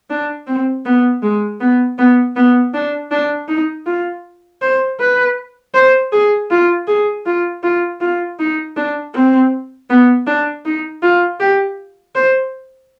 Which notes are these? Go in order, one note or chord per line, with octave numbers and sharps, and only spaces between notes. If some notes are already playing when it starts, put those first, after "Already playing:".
D4
C4
B3
G#3
B3
B3
B3
D4
D4
D#4
F4
C5
B4
C5
G#4
F4
G#4
F4
F4
F4
D#4
D4
C4
B3
D4
D#4
F4
G4
C5